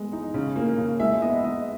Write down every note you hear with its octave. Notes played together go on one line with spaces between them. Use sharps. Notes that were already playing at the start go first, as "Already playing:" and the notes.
Already playing: G#3 B3
D#4
C#3
A#3
C#3
G#3 E5
B3 D#5
B3 D#5